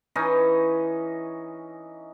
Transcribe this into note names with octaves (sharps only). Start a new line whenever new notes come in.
E3 C#4 D#4 D#5